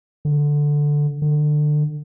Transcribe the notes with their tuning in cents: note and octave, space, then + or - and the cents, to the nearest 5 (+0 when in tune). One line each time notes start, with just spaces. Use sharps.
D3 +0
D3 +25